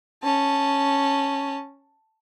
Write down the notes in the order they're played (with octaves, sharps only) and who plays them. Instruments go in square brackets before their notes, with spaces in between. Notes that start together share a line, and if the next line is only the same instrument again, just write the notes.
[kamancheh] C#4 A5